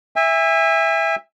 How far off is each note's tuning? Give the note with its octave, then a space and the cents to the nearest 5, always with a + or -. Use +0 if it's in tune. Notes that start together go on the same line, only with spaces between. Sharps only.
E5 +0 G#5 -40